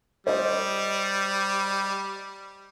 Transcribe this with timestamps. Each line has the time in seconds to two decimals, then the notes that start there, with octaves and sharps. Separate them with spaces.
0.27 G3 C5 D#5